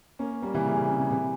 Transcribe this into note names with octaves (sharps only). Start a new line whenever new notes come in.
A#3 C#4
G3 A#3
C3 E3
C#3
C3
C#3
C#3
C3 E3